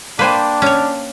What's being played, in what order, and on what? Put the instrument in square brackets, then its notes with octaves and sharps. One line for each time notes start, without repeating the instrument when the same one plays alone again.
[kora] A#3 C5 G5 [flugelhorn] D4 [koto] B4 G#5
[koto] C#4 C#5